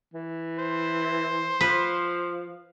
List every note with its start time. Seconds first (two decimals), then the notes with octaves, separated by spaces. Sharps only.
0.14 E3
0.59 C5
1.61 F3 B4